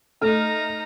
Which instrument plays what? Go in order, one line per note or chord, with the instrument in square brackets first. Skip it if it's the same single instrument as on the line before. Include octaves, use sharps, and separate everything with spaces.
[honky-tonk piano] A3 F6 [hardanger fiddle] D#4 A#5